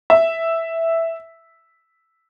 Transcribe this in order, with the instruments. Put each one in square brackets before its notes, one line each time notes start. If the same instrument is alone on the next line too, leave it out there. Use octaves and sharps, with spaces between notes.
[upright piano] E5